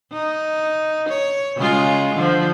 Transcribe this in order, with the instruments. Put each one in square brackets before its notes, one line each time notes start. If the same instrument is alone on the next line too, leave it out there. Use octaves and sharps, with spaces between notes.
[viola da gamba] D#4
C#5
C#3 G#3 F4
D3 F3